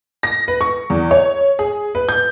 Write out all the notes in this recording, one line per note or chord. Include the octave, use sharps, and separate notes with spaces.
A#6
B4
C#6
E2
C#5
G#4
B4
G6